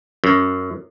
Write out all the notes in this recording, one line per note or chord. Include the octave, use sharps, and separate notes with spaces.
F#2